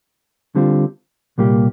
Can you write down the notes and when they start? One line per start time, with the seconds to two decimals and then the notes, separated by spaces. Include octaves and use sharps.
0.55 D3 G3 C4 F4
1.38 C2 A#2 G3 A#3 G4